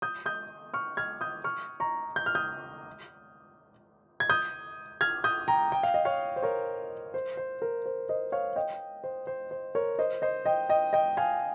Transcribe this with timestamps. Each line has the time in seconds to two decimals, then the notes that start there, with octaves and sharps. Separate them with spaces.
0.02 D#6 G6
0.26 D#6 G6
0.74 C#6 F6
0.97 F6 G#6
1.21 D#6 G6
1.44 C#6 F6
1.80 A#5 C#6
2.16 G6
2.26 F6
2.35 D#6 G6
4.20 G#6
4.30 D#6 G6
5.01 F6 G#6
5.24 D#6 G6
5.48 G5 A#5
5.72 G5
5.83 F5
5.94 D#5
6.05 C#5 F5
6.36 C5
6.42 A#4 C#5
7.14 C5
7.37 C5
7.62 A#4
7.86 C5
8.09 C5 D#5
8.32 C#5 F5
8.56 D#5 G5
9.04 C5
9.27 C5
9.51 C5
9.75 A#4 C#5
9.99 C5 D#5
10.22 C5 D#5
10.45 D#5 G5
10.69 D#5 G5
10.93 D#5 G5
11.17 F5 G#5